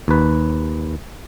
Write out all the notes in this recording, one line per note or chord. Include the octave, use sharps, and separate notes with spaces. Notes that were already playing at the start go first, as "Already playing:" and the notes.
D#2 B4